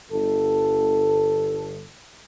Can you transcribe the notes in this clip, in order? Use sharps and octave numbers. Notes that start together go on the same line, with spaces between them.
G1 A4